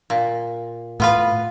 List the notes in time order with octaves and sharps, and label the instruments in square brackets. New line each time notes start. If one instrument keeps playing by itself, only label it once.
[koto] A#2
[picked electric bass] A2 [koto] B3 F4 B4